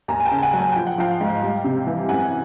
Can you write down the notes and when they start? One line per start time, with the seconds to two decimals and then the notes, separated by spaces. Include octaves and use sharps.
0.08 D#2 G#5 A#5
0.20 G#5
0.25 G5 A5
0.31 C#3
0.43 F#5 G#5
0.53 F#3
0.59 G#5
0.72 F3 G5
0.87 F#5
0.98 F3 F5 G5
1.21 G#2
1.42 G3
1.64 C3
1.87 E3
2.09 F#2 F#5 G#5